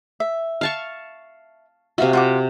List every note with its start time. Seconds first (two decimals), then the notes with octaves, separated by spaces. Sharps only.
0.20 E5
0.61 F5 A5 C#6
1.98 C3 F#4 E5 F5
2.13 F4 F#5 D6